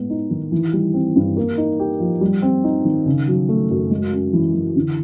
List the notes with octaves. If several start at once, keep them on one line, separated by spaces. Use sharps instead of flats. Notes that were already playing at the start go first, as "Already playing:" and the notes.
Already playing: A2 G#3 B3
D#4
D#3
E3
G3
C4
G2
A#3
D#4
G4
F3
G3
C4
D#4
D#3
C#3
F#3
A3
F#2
G#3
C#4
E3
E3
D3